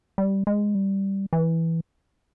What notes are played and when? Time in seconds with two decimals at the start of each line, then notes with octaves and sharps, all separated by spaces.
0.18 G3
0.47 G#3
0.75 G3
1.33 E3